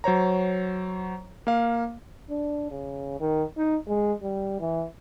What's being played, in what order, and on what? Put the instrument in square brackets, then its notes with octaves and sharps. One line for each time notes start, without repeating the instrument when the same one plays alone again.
[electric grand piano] F#3 C5 C#5 A#5
A#3 F5
[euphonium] D4
C#3
D#3
D#4
G#3
G3
E3